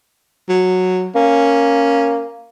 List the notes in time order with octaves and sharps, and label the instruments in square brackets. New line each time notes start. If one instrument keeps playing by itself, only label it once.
[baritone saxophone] F#3
[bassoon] A#3 [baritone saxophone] C#4